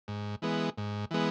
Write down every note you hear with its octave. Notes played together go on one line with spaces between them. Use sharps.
G#2
E3 G#3 B3
G#2
E3 G#3 B3